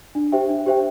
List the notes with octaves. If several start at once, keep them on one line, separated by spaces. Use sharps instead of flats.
D4
G4 C5 E5 G5
D4
G4 C5 E5 G5